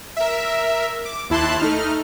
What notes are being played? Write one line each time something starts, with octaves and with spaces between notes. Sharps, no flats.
A#4 E5
D6
D#2 E4 A5 C6 F#6
A3 D#4 F6